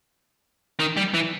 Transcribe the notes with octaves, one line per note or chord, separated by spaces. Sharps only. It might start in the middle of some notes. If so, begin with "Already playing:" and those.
D#3
G3
E3